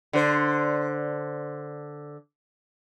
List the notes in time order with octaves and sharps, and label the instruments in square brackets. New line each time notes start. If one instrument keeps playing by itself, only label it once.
[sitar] D3 C5